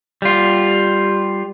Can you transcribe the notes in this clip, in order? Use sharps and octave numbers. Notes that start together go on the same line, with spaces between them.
G3 F4